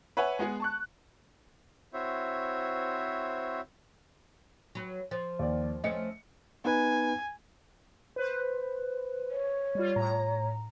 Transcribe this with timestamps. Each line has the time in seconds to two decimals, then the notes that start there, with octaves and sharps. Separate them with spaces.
0.17 B4 C#5 E5 F#5 G#5
0.39 G#3 B3 G#4
0.60 A5 C#6 F#6
1.93 C4 E4 F#4 C5 C#5 E5
4.75 F#3 B4
5.11 F3
5.39 D#2 D5
5.84 F3 A3 C#4 D#5 C#7
6.65 B3 D#4 B4 G#5
8.16 B4 C5
9.30 C#5
9.75 G3 F4
9.96 A2 A#5